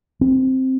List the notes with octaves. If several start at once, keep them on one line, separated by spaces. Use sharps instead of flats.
C4